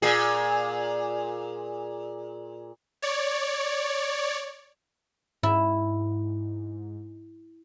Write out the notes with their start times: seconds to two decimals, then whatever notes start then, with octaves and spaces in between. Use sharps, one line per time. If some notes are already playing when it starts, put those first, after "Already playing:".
0.02 A#2 G#4
3.02 C#5 D5
5.43 G#2 E4